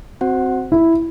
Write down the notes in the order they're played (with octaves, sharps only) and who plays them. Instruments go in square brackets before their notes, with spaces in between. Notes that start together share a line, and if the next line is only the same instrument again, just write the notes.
[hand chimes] C4 F#4 C5 F#5
[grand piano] E4